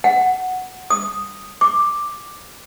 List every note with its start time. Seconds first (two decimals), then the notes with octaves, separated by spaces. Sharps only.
0.04 F#5
0.90 D#6
1.61 D6